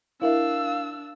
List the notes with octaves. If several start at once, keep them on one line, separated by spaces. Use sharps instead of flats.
D4 E4 A#4 E5 F5 E6